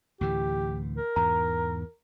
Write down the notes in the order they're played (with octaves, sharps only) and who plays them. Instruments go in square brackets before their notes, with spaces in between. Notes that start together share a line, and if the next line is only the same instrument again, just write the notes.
[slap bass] D2 A2 E3 [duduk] G4
[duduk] A#4
[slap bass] E2 G#2 [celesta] A#5